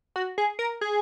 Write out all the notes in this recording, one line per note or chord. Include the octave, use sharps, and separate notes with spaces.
F#4
G#4
A#4
G#4